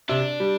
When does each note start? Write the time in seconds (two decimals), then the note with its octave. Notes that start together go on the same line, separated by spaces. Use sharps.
0.09 C3 D4
0.40 G3